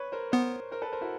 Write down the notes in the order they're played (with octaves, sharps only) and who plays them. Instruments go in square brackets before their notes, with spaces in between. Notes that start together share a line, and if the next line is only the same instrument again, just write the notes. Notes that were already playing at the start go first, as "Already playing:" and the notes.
Already playing: [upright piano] B4 C#5
A#4 C5
[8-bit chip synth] B3 [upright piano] A#4 C5
[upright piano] A#4 C5
A4 B4
A#4 C5
E4 F#4